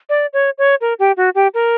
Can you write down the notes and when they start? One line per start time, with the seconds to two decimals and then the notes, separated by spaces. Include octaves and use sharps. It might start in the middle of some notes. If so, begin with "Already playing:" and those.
0.09 D5
0.33 C#5
0.58 C#5
0.81 A#4
0.99 G4
1.17 F#4
1.35 G4
1.54 A#4